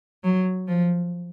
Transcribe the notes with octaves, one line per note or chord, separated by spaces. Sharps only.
F#3
F3